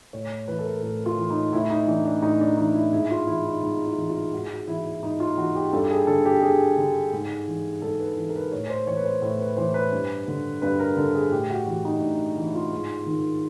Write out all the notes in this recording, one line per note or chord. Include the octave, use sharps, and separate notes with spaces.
A2 C#5
E3 B4
A4
A#4
A2 A#4
F4
E3
D#4
A2 E4
D#4
E3 D4
D4
A2 D#4
D4
E3 D#4
E4
G#2 E4
F4
E3 E4
D#4
G#2 D#4
E4
E3
F4
G#2 F#4
F#4
E3 E4
E4
G#2 D#4
F4
E3 F#4
G4
G2 A4
G4
G#4
D3 A4
G4
G2 G#4
D3
G#2
E3
G#2 A4
B4
E3
A#4
B4
A2 C#5
C5
E3 C#5
B4
C5
A2 B4
B4
E3 C5
B4
G2
D3
G2 B4
A#4
D3 A4
G#4
A2 G4
F#4
E3 F#4
D#4
A2 D4
E3
E4
F4
G#2
D#3